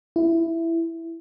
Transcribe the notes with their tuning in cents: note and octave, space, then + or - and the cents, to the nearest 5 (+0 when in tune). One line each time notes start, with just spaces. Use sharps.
E4 +10